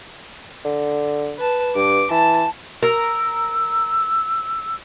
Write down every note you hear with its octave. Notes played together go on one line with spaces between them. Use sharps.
D3
B4 A5
G2 D6
E3 A5
A#4 E6